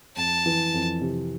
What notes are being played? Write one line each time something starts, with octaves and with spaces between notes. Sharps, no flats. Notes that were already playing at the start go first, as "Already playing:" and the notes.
F2 A5
E3
F2
C3